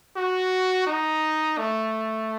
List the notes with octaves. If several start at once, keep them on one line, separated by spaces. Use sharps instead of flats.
F#4
D#4
A3